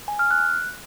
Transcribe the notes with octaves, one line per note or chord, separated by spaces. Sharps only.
G#5
F6
F#6